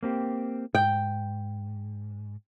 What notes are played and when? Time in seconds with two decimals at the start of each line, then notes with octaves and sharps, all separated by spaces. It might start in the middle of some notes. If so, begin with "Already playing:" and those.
0.03 A#3 C4 G4
0.75 G#2 G5